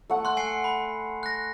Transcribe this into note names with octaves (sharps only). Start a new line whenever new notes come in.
A3 F#5
C6 F#6
G#5 C7 C#7
B5
F#6 A#6